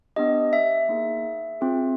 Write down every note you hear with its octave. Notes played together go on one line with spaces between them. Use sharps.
B3 D4 G4 D#5
E5
A#3 D#4 G#4
C4 F4 G#4